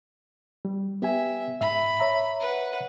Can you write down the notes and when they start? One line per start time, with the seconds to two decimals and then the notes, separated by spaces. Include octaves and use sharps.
0.65 G3
1.02 B3 G4 E5 G#5
1.61 G#2 E5 B5
2.00 C#5 E5 A#5
2.40 B4 F#5